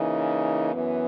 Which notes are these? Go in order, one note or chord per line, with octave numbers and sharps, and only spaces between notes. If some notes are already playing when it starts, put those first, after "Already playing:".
Already playing: C#3 E3 A#3 D#4
F#2 E3 B3